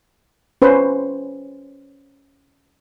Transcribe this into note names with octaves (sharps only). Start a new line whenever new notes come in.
C#4 B4 C5